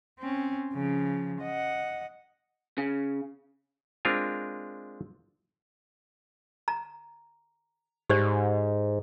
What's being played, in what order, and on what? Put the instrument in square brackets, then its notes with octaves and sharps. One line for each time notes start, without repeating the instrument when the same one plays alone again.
[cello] C4 C#4
C#3 F3
D#5 F#5
[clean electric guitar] C#3
[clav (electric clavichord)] G#3 C4 D4 F4 A#4
[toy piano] A#5
[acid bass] G#2 [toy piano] G4 C5 D5